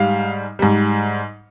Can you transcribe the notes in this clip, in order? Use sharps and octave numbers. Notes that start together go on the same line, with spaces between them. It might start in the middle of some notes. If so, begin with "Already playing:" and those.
Already playing: G#2 G3 F5
G#2 G3